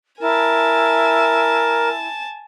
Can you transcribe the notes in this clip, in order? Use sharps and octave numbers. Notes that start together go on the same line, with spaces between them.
E4 A#4 G#5 A5